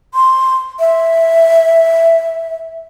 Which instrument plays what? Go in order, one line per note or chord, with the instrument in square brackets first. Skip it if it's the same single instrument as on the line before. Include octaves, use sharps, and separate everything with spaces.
[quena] C6
E5